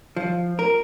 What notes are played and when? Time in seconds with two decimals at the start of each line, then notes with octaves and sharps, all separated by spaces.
0.16 F3
0.59 A#4